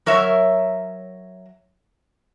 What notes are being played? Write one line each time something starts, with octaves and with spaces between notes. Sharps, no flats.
F#3 A#4 C#5 E5